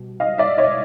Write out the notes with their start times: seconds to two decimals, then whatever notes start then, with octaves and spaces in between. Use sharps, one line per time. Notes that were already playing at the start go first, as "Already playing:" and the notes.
Already playing: B2 G3
0.20 D#5 F5
0.38 D5 E5
0.58 C#5 D#5